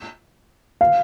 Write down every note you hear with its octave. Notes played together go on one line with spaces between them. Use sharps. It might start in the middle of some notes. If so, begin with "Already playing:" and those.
F5